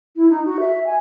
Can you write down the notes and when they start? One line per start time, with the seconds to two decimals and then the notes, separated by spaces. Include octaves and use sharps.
0.16 E4
0.30 D#4
0.45 F#4
0.60 E5
0.87 G#5